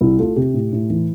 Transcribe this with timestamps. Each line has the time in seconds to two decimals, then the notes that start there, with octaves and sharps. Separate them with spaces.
0.01 C2 E4
0.18 A3 F4
0.36 C3 G4
0.54 A2
0.73 A2
0.90 E3